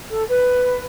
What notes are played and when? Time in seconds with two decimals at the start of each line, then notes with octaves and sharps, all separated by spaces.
0.09 A4
0.29 B4